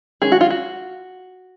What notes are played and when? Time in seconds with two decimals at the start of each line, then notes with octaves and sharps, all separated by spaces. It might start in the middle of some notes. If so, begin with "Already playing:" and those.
0.22 D#3 G#3 C#4 G#4
0.32 F#4
0.41 F4
0.50 F#4